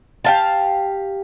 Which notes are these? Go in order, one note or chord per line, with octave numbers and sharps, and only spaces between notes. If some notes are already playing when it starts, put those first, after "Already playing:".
G4 F5 A5